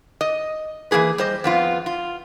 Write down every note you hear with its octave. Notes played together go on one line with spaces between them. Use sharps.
D#5
E3 F#3 A#3 G#4 B4
G3 C5 D#5
F2 B3 F4
F4